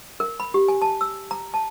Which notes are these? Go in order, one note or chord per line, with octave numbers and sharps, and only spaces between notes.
A#4
B5
G4
G#5
A5
E6
A#5
A5